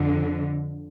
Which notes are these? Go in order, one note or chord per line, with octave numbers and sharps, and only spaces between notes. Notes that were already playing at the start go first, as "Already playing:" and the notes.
Already playing: F2 D3